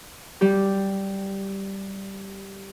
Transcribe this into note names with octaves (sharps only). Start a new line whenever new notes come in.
G3 G4